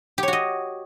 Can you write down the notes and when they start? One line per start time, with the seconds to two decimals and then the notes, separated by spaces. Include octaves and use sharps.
0.18 G4
0.23 C#5
0.28 F#4
0.33 D#5